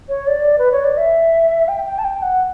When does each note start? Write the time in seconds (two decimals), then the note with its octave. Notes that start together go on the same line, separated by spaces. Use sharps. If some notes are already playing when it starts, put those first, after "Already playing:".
0.09 C#5
0.27 D5
0.58 B4
0.72 C#5
0.84 D5
0.97 E5
1.68 G5
1.86 G5
1.99 A5
2.04 G5
2.22 F#5